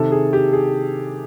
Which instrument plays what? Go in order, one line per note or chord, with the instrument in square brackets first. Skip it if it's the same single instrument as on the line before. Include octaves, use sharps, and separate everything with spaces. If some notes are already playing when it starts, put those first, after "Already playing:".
Already playing: [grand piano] C3 D#3 A4
G#4
G4
G#4